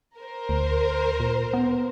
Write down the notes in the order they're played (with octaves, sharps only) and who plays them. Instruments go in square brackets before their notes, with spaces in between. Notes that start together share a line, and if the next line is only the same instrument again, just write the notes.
[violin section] A#4 C5
[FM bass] D2
A#2
B3